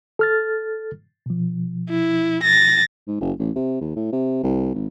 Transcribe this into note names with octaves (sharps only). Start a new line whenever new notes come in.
A4 F6 A6
B2 F3
E4
A6 A#6
G#2
F#1
A1
C3
D#2
A2
C3
C2
G#1